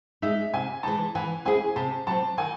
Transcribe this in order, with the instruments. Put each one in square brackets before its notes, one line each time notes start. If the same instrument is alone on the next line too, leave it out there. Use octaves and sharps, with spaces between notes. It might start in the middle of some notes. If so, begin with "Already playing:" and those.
[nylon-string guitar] G#3 D#4 [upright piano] E5
[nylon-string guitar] C3 [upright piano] G#5
[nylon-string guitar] E3 G#3 D#4 [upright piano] A5
[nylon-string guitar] E3 [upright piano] G#5
[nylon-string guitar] C4 E4 G#4 [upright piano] G#5
[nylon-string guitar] C3 [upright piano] A5
[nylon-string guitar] F#3 C4 [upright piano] A5
[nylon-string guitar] D#3 [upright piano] G#5